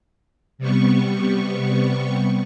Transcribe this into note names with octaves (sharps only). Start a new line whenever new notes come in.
C3 G3 B3 C#6